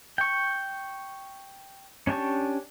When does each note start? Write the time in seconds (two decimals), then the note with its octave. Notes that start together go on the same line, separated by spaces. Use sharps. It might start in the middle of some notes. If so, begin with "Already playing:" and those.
0.18 G5 C#6
2.07 C#4 D4 G4 A5 C#6